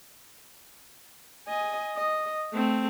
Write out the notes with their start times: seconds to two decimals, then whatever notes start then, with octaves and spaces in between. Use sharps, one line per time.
1.48 D#5 G#5
1.97 D#5
2.53 A3 C4